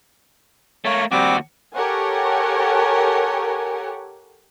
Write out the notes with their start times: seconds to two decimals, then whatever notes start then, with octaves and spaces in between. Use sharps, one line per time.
0.85 A3 A#3 C#5
1.12 D#2 G3 C4 F#4 D6
1.73 G4 A4 A#4 C#5 F#5 G#5